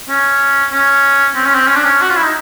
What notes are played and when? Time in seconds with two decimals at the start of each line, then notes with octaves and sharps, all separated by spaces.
0.09 C#4
0.72 C#4
1.35 C4
1.46 C#4
1.55 C4
1.67 C#4
1.76 D4
1.84 C#4
2.02 F#4
2.10 F4
2.16 E4
2.24 D#4